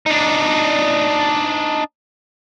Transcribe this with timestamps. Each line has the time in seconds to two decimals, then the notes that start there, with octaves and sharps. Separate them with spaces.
0.06 D4 D#4